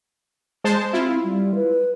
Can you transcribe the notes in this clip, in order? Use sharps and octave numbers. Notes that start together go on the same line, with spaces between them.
G#3 C5 A5
C4 E4 F4
G3
B4